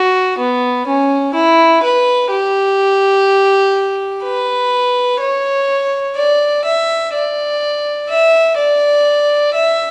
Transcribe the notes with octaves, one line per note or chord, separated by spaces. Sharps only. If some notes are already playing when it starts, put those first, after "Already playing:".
Already playing: F#4
B3
C#4
E4
B4
G4
B4
C#5
D5
E5
D5
E5
D5
E5